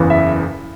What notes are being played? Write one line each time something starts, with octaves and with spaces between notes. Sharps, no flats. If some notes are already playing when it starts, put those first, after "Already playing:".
Already playing: F#1 E2 C#3 E3 B3
E5